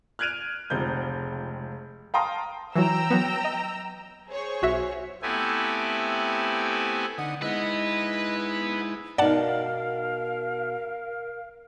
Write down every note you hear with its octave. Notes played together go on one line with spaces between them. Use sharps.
F6 F#6 G#6 D7 D#7 F7
F1 C#2 C4 G6
F5 G5 A5 A#5 C6 D#6
E3 F#3 E4 G5 A#5 E6
F#3 B3
D#5
G#4 C5 C#5
B1 F#4 E5
A3 B3 C4 E4 G4 G#5
D3 D#4 D#5 F#5
G#3 D#4 E4 B4 D#5 F#5
B2 D#4 A#4 D5 F5 F#5 A5